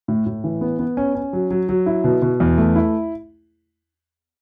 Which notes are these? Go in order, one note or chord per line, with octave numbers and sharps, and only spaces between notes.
A2
A2
E3
B3
B3
C#4
C#4
F#3
F#3
F#3
E4
B2
B2
E2
A3
E4